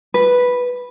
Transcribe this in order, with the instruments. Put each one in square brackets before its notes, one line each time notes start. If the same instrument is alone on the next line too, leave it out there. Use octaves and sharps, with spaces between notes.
[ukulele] B4